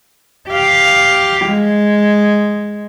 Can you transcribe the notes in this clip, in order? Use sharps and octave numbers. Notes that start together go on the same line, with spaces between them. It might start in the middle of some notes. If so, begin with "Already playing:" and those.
G4 F5
G#3